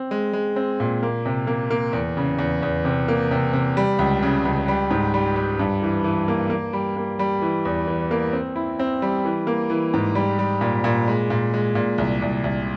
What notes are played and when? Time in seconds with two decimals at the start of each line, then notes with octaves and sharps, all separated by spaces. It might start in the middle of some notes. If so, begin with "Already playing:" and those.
Already playing: C4
0.11 G#3
0.33 G#3
0.56 C4
0.80 A#2
1.03 A#3
1.25 C3
1.47 A#3
1.70 A#3
1.93 E2
2.17 C#3
2.39 E2
2.63 E2
2.85 C3
3.08 A#3
3.31 C3
3.53 C3
3.77 G3
3.99 C#2
4.23 C#3
4.45 C#2
4.68 G3
4.91 G#2
5.14 G3
5.36 G3
5.59 G2
5.82 E3
6.04 E3
6.28 A#3
6.50 A#3
6.73 G3
6.97 A#3
7.19 G3
7.42 E3
7.65 E2
7.87 E3
8.11 A#3
8.33 C4
8.56 E4
8.79 C4
9.02 G3
9.25 E3
9.47 A#3
9.70 E3
9.94 G#2
10.15 G3
10.39 G3
10.61 A#2
10.84 A#2
11.08 G#3
11.30 A#2
11.54 G#3
11.75 A#2
11.98 C2
12.22 C2
12.44 C2